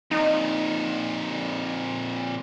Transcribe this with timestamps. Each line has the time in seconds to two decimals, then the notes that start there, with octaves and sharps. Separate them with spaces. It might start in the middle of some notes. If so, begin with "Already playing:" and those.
0.11 F2 A#2 D#4